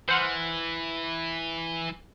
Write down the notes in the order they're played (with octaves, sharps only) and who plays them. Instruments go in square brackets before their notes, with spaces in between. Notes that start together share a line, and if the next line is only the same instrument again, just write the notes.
[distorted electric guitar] E3 [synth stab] C5 F#5 F6